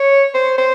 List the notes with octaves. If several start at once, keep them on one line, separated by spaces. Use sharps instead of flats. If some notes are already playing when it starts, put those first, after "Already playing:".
Already playing: C#5
C5
C5